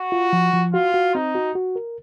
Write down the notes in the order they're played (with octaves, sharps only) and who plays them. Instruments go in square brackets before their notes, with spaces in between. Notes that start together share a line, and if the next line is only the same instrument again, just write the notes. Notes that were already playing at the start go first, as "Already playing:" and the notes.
Already playing: [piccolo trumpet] F#4
[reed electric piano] F4
F3
F3
[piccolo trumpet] F4 [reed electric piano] F#4
[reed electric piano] F#4
[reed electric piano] C4 [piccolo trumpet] D#4
[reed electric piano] F#4
F#4
A#4